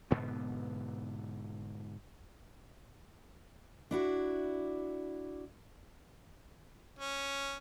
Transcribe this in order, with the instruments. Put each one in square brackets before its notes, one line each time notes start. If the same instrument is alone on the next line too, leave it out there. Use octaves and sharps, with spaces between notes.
[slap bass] G#2 B2 D3 B3
[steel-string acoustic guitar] D4 E4 F#4
[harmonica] C#4